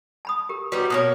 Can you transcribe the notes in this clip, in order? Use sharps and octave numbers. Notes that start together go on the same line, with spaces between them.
A5 B5 D#6
G4 A#4
G3 B3 D#4 F#4
B2 A#3 C#5 D#6